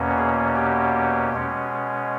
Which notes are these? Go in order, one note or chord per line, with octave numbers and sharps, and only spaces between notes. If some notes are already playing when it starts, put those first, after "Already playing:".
Already playing: E2 B2 A#3 C#4
G#4
G4
B2 G#3 C#4